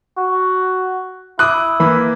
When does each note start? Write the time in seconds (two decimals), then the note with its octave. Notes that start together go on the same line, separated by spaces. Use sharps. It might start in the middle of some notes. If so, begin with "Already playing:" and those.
0.18 F#4
1.39 E4 D6 D#6 F#6
1.80 E3 A#3 B5